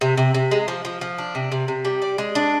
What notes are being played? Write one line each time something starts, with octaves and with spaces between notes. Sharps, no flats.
C3
C3
C3
G#3
F3
F3
F3
D4
C3
C3
C3
G3
D5
G#3
D4